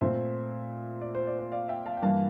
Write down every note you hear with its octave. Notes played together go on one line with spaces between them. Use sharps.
A#2 A3 C4 C5 E5
D5
C5
D5
C5
D5 F5
E5 G5
F5 A5
G5
G2 E3 A#3 F5 A5